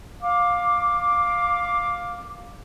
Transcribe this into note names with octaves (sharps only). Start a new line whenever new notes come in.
F5 D6